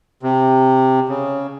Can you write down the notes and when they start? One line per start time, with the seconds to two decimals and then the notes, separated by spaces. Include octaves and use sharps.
0.23 C3
1.09 C#3